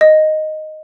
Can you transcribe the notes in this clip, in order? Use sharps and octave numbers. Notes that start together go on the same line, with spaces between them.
D#5